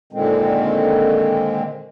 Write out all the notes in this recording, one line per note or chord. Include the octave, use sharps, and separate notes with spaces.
A#2 D3 D#3 G#3 C4